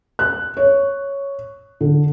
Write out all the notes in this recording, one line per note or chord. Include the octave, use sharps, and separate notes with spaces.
F#6
C#5
D3